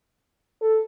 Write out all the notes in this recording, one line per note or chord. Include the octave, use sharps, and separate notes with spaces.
A4